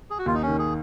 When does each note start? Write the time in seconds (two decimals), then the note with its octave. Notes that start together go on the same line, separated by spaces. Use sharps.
0.10 G#4
0.19 F#4
0.26 D#2 F4
0.34 D#4
0.42 C#4
0.48 D#3
0.59 G#4